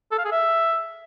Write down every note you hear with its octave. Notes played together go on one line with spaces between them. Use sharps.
A4
F5
G#4
E5